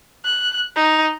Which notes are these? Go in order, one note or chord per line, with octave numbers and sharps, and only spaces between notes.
F#6
D#4